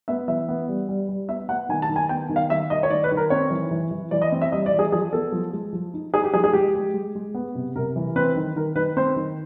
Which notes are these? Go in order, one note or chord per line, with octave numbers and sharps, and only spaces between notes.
B3 E5
E3 E5
B3
G3
G3
G3
B3 E5
B3 F#5
D#3 G#5
A5
D#3
G#5
B3 G5
D#3
F5
D#3 E5
D#3 D#5
C#5
D#3 D5
B4
D#3
A#4
C4 C#5
E3
E3
E3
E3 D5
D#5
C4
E5
G3 D#5
D5
E3
G#4
F3 G#4
B3 A4
F3
G#3
F3
D#4
D#4 G#4
G4
F3 G#4
G#4
G#3 G4
G#3
G#3
G#3
B3
C3
C3 A#4
E3
C4 B4
D#3
D#3 A#4
D#3 B4
C4 C5
D#3